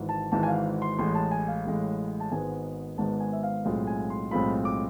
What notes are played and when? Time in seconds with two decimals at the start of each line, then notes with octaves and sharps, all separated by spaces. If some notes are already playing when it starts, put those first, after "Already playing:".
Already playing: G#1 G#2 E3
0.09 A5
0.32 G#1 G#2 E3 A5
0.43 G#5
0.48 F5
0.82 C6
0.99 A1 A2 G#3 C6
1.15 A5
1.31 G#5
1.48 F5
1.65 A1 A2 G#3
2.20 A5
2.31 G#1 G#2 G#3 B3 G#5
2.98 G#1 G#2 G#3 B3 A5
3.20 G#5
3.33 E5
3.43 F5
3.65 B1 A2 G#3 C4 F4 F5
3.87 G#5
4.10 C6
4.31 B1 A2 G#3 C4 F4 B5
4.65 D6